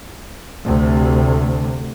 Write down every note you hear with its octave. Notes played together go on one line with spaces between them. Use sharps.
D2 C3